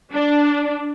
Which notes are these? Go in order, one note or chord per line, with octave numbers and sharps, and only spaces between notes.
D4